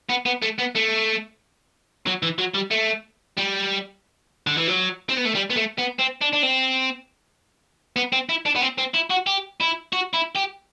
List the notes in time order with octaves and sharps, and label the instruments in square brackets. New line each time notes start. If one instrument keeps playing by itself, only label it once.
[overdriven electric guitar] B3
B3
A3
B3
A3
F#3
E3
F#3
G3
A3
G3
D3
E3
F#3
C4
B3
A3
G3
B3
A3
B3
C4
D4
D4
C4
B3
C4
E4
D4
B3
C4
C4
E4
F#4
G4
E4
F#4
E4
G4